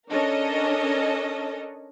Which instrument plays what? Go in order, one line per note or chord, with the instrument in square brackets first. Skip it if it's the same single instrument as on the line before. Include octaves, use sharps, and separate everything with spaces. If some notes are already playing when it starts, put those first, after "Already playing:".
[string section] C#4 D4 A4 A#4 C#5 D#5